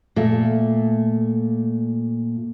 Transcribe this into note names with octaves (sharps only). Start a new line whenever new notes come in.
A#2 A3